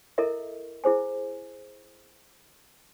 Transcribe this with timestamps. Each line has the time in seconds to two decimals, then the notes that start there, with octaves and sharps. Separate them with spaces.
0.18 E4 A4 A#4 D#5 E5
0.84 E4 G#4 C5 G#5